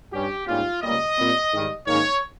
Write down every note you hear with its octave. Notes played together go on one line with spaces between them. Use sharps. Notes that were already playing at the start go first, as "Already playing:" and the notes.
G2 G3 C#4 G4
G#2 G3 A#3 C#4 F4
C#2 C#3 G3 A#3 D#5
A#2 G3 C4
G#2 D#3 G3
G#2 D#3 A#3 C#4 C#5